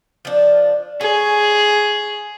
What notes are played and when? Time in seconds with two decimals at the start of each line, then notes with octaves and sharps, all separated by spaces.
0.25 F3 D4
1.01 G#4 C#5